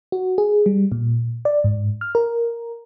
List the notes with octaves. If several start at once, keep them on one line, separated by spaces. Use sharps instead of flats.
F#4
G#4
G3
A#2
D5
G#2
F6
A#4